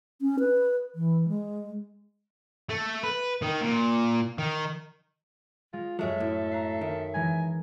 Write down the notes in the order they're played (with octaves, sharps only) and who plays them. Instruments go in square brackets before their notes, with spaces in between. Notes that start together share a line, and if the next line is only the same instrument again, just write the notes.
[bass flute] C#4
B4
E3
G#3
[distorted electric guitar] A3
B4
D#3
A#2
D#3
[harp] G#3 [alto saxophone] F4
[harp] F#2 F6 [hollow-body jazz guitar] F#3 G#3 [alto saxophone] A4 [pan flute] E5
[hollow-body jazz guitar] A2
[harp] A#5 F#6 C7
[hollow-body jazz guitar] D#3
[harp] E3 G#3 A#4 [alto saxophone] G#5